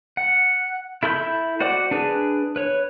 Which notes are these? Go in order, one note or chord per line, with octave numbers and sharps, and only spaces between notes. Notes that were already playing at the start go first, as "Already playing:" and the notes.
F#5
E4 A4 B5 C6 G6
F#4 C5 D5 F#5 D6
D4 G#4 B4
B4 C#5